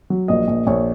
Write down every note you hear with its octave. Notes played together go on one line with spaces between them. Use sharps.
F#3
A#1 D#5
A#1
A#1 C#5